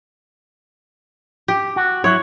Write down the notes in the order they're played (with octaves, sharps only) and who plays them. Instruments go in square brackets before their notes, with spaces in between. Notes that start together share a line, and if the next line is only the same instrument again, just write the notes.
[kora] G4
[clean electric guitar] F#4
[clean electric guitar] F#3 E4 [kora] C#5